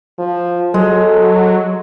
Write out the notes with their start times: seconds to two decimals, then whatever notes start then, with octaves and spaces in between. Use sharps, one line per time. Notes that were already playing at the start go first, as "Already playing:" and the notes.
0.19 F3
0.74 F#3 G#3 A4